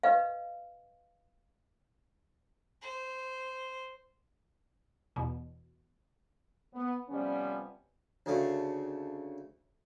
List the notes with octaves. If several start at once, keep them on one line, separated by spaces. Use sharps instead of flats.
B4 D#5 F5
C5
E2 B2
B3
C3 F3 G3 B3 C#4
D2 C#3 A3